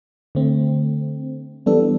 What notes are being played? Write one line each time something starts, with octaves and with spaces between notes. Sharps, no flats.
D3 A3 C4
E3 G3 B3 D4 A4